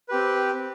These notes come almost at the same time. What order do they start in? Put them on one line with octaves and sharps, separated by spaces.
B4 G4 C4